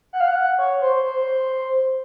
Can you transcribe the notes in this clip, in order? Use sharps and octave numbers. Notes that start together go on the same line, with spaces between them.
F#5
F5
F#5
C#5
C5
C5